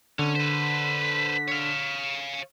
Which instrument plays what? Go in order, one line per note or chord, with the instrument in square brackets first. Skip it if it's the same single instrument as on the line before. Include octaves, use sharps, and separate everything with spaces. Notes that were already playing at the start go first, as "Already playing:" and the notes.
[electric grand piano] D3 [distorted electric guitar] C#4
[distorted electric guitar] B4 C5 [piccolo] B6
[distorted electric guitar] C#5 F5